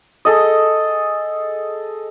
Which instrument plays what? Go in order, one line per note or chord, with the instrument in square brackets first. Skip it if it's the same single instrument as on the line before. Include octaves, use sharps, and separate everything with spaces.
[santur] G#4 A4 D#5